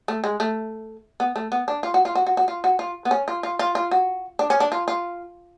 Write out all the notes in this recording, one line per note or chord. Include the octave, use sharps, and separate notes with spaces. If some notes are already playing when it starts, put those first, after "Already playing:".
A3
G#3
A3
B3
A3
B3
D4
F4
F#4
F4
F#4
F#4
F#4
F4
F#4
F4
B3
C#4
F4
F4
F4
F4
F#4
D4
C#4
D4
F4
F4